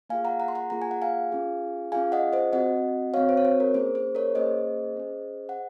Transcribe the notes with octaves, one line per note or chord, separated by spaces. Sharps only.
A#3 F4 G#4 F5 G#5
F#5 A#5
F#5 A#5
C6
F#5 A#5
A#3 F4 G#4 A#5
G#5
F#5
F5 G#5
C#4 F4 G#4
C#4 F4 G#4 F5 G#5
D#5 F#5
C5 D#5
C4 F#4 D#5 F#5
C4 F#4 C#5 F5
C5
C#5
C5
A#4
A#3 C#4 G#4 C5
C5
A#4 C#5
A#3 C#4 G#4 C5 D#5
C#4 G#4
F#5